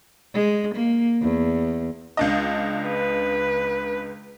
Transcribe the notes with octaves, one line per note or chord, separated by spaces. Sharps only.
G#3
A#3
E2
C#2 D4 D#5
B4